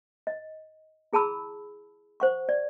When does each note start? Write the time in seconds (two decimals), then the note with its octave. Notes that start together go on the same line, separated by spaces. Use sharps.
0.27 D#5
1.13 E4 G#4 A5 B5 E6
2.20 C5 F#5 C#6
2.49 D5